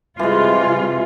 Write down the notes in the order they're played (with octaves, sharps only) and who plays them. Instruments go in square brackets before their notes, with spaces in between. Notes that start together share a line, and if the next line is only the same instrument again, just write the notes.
[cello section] C3 G3 F4 [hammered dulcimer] E3 G#3